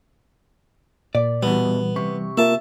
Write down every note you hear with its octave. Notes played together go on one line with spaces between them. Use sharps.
A#2 D5
E2 B2 E3 G3 B3
C3 C#6
A#3 F4 A#4 E5 A5